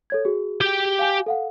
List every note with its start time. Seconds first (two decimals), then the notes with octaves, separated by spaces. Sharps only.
0.10 A4 C#5 G#6
0.25 F#4 G#4
0.61 G4 G5
0.99 F5 G#5
1.26 A4 F5 F#5